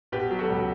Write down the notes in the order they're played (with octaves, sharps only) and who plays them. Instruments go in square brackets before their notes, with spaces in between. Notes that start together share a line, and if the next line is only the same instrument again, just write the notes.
[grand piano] B2 G4 B4
F#3
F#4 A4
C#2